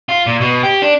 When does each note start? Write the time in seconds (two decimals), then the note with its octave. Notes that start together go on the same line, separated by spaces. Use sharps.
0.09 F4
0.26 A#2
0.40 B2
0.63 G4
0.82 D4